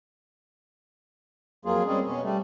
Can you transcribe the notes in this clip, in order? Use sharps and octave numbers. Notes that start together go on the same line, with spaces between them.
F2 F#3 A#3 F4 G#4
G3 G#3 C4 C#4 G#4
B2 C#4
G3 A3